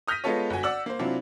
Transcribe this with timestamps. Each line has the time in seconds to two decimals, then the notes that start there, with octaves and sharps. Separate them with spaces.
0.08 D#6 F6 G6 A#6 B6 D#7
0.24 G#3 B3 F4 A4 C#5
0.50 G1 F#4 G#5
0.63 D5 F#5 E6 F#7
0.86 A#3 C5
0.99 C3 F#3 C4 D4 E4 F4